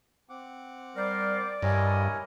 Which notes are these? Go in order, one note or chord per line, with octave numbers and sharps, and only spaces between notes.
C4 F#5 D6
G3 A#4 C5 D5
G2 E4 G4 A#4 C#5 D#5 G#5